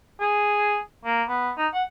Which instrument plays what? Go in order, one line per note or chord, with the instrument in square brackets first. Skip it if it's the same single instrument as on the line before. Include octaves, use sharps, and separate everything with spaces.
[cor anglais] G#4
A#3
B3
D#4
F#5